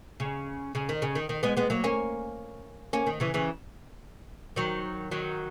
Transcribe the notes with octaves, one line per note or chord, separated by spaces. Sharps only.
C#3
C#3
D#3
C#3
D#3
D#3
G#3 B3
G#3 B3
F#3 A#3
A#3 C#4
A#3 C#4
D#3
C#3 E3
C#3 E3
D#3 F#3
D#3 F#3